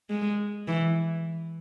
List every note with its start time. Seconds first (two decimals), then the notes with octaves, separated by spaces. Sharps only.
0.10 G#3
0.68 E3